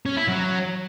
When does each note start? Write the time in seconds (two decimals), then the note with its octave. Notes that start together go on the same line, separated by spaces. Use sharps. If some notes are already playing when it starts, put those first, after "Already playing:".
0.06 C#4
0.17 E4
0.28 F#3